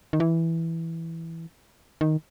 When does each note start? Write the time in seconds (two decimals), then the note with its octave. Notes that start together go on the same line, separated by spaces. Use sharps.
0.13 D#3
0.20 E3
2.01 D#3